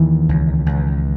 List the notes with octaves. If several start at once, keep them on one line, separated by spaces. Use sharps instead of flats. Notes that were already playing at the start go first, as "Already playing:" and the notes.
Already playing: D#2 D#3 E3
C#2
C#2